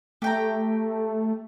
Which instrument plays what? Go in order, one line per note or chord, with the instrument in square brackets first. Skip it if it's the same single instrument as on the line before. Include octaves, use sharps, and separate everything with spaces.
[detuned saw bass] A3 [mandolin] G4 G5 A#5